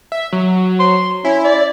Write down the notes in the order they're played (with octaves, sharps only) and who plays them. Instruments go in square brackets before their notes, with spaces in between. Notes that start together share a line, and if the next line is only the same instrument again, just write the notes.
[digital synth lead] E5
F#3
[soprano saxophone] C6
[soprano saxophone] C#4 [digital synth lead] E4
[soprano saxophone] D5